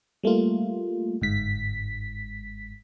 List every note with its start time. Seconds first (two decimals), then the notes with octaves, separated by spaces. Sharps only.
0.23 G3 A3 A#3 F4
1.21 G1 G#2 B6